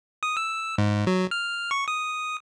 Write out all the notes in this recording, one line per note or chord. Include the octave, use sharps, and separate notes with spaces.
D#6
E6
G#2
F#3
F6
C#6
D#6